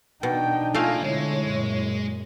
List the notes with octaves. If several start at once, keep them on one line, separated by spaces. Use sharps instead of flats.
B2 D4 D#4 G5
A3 A#3 F4 F5 G#5
B2 D3 G#3 E4 C#5
F#2 A#2